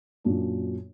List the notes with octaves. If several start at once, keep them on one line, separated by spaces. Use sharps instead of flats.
F#2 A#2 D4